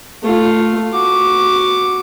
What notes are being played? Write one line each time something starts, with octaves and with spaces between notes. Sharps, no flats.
A3 F4
F#4 D6